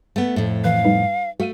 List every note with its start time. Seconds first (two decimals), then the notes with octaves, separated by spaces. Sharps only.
0.16 A3 B3
0.36 F2 A2
0.64 E3 B4 F5 F#6
0.85 G3 D#4 B4
1.40 A3 F#4 F5 D#7